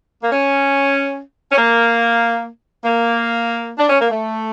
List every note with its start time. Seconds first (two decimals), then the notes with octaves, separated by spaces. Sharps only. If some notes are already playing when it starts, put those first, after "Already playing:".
0.23 A#3
0.32 C#4
1.52 C#4
1.58 A#3
2.84 A#3
3.78 D4
3.89 C#4
4.00 A#3
4.10 A3